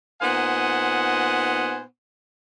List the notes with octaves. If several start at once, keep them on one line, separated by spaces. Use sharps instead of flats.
A#2 B3 D#4 C5 F#5 G#5